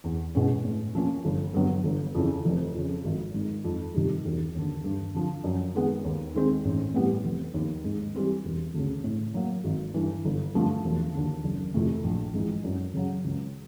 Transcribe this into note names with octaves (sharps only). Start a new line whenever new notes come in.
E2
B2 G#3 C#4 E4
A2
F3 A#3 C#4
G1
G2 D3 F#3 B3
G1
F2 C#3 E3
F1
F2 C#3
G#1
G#2 D#3
F2
C3 D#3 G3
E1
D#2 D3
G2
D3 F3
F#2
D#3 G#3 B3
D#2
D#3 G#3 C4
A1
A2 E3 G3 B3
F1
D#2 D#3
G#2
E3 G3 C4 E4
E1
D2 C#3
A2
F#3 A#3
G#1
G2 E3
G1
G2 D3 F3 A3
E1
D#2 D3
F#1
F2 C3 E3 A3
A#1
G#2 E3
F#2
C#3 F#3
C#2